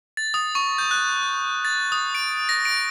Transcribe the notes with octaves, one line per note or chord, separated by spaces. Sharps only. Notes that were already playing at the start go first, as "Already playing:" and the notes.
A6
D#6
C#6
G6
F#6
A6
D#6
D7
A#6
D7